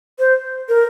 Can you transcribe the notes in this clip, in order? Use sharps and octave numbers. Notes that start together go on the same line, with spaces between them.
C5
A#4